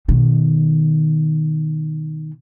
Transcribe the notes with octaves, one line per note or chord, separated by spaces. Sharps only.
B2 D#3